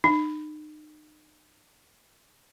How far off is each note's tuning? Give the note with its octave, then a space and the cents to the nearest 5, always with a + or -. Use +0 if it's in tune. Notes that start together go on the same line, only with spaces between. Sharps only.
D#4 -35